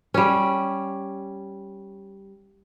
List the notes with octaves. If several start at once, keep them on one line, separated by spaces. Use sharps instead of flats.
G3 C#4